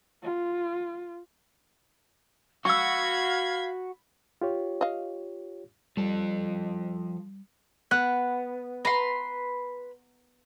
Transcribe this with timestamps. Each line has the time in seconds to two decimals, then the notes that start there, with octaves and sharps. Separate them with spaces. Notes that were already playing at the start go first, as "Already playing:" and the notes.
0.23 F4
2.65 F#4 F5 B5 C#6 E6 G#6
4.42 F4 G4 C#5
4.81 D#5 F5
5.97 F3 G3 A4
7.91 B3 F#6
8.85 B4 A#5 C6